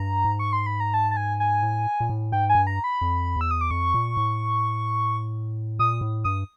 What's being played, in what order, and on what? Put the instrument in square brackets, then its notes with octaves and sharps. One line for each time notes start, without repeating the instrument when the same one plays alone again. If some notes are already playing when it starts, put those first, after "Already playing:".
Already playing: [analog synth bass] G2 [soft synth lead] A#5
[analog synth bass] G#2
[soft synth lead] C#6
C6
B5
A#5
A5
A5
G#5
G#5
[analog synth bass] A2
A#2
A2
[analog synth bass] G#2 [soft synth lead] G5
[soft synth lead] G#5
[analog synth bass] G2
[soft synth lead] A#5
B5
[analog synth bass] F2
[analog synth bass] E2 [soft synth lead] E6
[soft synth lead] D#6
D6
[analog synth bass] F2 [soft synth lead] C#6
[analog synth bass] A#2
A2
[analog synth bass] A#2 [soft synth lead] D#6
[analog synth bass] A2
[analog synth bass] G2 [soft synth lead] D#6